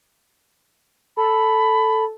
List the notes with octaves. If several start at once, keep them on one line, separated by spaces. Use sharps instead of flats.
A4 B5